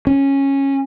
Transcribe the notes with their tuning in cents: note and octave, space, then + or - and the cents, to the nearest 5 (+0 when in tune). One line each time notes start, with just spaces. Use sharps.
C#4 -10